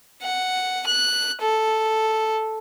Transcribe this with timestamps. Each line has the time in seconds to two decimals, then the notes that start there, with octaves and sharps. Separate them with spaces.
0.23 F#5
0.87 F#6
1.42 A4